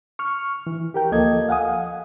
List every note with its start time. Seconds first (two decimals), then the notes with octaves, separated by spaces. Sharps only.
0.19 C#6 F6
0.67 E3
0.94 G4 A#4 G5
1.11 D2 F3 A#3 A4 D#5 G#6
1.49 F5 F#5 G#5 D#6